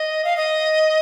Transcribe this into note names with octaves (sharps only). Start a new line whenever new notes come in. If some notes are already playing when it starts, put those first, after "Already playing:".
Already playing: D#5
F5
D#5